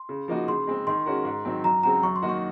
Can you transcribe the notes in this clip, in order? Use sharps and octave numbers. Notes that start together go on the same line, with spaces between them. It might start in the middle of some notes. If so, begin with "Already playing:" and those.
Already playing: C6
C#3
F3 A#3 D#4 F#4
C#3 C6
G#3 C4
D#3 C6
G#3 C#4 F#4 A#4
G#2
D#3 F#3 C4
F#2 A#5
C#3 G#3 C4 F#4 A#5
F#2 C#6
C6
D#3 A#3 D#4 F#4
C#6